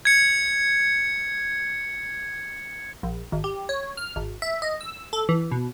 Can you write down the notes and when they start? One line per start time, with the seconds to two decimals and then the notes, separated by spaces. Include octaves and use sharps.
0.05 G#6 C#7
3.03 A#1
3.32 G#1
3.44 G4
3.69 C#5
3.97 F6
4.16 G#1
4.42 E5
4.62 D#5
4.81 E6
5.13 A4
5.29 E3
5.52 B2